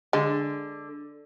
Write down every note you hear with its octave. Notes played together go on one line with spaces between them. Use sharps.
D3 G#3